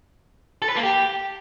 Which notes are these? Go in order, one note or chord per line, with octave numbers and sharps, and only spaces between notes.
A4
B4
A#3
G4